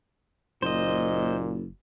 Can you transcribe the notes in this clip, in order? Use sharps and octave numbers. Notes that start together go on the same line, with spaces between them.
F#1 A#2 C5 D#5